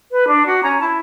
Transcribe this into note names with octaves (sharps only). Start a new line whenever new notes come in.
B4
D4
F#4
C#4 A#5
E4 A5